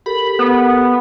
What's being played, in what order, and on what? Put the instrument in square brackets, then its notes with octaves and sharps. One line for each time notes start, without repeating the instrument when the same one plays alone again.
[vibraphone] G4 A4 A#4 [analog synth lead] B5
[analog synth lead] B3